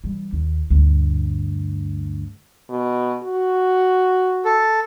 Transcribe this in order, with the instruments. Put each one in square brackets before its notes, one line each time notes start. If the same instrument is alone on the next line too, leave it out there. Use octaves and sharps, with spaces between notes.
[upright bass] E3 G3
D#2
D2 G2
[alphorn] B2
F#4
[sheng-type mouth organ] A4